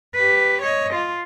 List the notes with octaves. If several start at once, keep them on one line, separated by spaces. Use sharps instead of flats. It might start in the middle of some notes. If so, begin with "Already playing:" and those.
G4 B4
C#5 D#5
F4